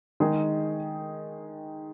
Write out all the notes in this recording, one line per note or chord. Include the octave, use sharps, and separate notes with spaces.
D#3 G#3 D#4 G#4